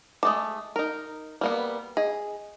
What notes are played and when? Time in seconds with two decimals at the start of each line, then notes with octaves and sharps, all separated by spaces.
0.23 G#3 A3 A5 D6 D#6
0.76 D#4 A#4
1.41 G3 A#3 B3
1.97 G#4 D#5